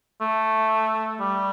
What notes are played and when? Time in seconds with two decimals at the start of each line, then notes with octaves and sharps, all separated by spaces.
0.21 A3
1.21 G3